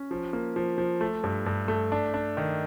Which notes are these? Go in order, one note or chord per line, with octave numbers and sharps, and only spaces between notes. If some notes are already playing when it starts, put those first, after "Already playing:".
Already playing: C#4
F3
A#3
F3
F3
A3
G2
G2
A3
D4
D4
D#3